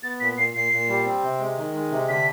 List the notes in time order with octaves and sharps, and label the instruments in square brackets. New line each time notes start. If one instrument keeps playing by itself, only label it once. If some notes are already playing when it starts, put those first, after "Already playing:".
[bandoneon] B3 [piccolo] A6
[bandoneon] A#2 [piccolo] B6
[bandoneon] A#2 [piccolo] C7
[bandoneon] A#2 [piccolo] C7
[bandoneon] A#2
G3
C4
C3
G#3
D#3
G#3
C3
[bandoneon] D3 [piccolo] B6